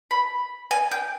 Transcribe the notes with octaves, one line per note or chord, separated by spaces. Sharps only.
B5
G#5
G5